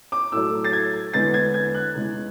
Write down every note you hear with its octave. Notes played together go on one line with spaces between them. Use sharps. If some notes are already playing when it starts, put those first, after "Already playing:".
D6
A2 F#3 A3 E6
A6
G#6
E2 D3 G#3 B3 A6
G#6
G#6
F#6
E2 C#3 G#3